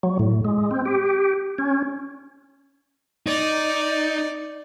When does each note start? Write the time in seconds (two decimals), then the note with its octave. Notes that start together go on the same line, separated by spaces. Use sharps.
0.03 F#3
0.19 A2
0.45 G#3
0.71 C4
0.85 G4
1.58 C#4
3.27 D#4 D5